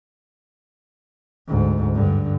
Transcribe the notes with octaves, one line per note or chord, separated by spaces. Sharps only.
D2 G#2
G2 D3